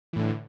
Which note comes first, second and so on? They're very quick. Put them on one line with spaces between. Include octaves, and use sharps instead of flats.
E3 A2 D3